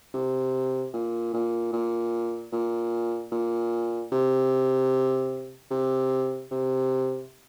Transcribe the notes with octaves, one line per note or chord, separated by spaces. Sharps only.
C3
A#2
A#2
A#2
A#2
A#2
C3
C3
C3